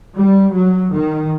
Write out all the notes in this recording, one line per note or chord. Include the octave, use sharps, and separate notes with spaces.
G3
F#3
D#3